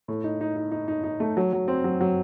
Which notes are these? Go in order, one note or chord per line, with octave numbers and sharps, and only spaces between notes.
A2
D#4
D#4
D#4
D#4
D#4
D#4
A3
F#3
F#3
C4
F#3
F#3